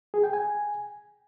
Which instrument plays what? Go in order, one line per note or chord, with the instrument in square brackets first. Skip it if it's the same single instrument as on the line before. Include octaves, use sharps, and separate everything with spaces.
[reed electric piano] G#4
G5
G#5